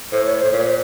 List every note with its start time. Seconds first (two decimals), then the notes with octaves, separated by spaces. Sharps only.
0.12 A2 C5
0.25 C#5
0.39 A2 C5
0.52 A#2 C#5
0.65 C5